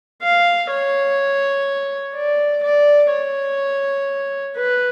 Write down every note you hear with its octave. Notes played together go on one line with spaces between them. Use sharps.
F5
C#5
D5
D5
C#5
B4